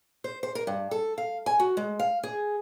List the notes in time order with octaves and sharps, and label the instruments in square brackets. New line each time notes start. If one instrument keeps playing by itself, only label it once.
[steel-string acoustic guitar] C5
C5
A#4
G2
A4
F5
G#5
F#4
G#3
F5
G#4